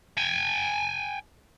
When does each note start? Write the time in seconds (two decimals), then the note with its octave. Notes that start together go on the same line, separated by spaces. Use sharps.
0.17 G5 G#5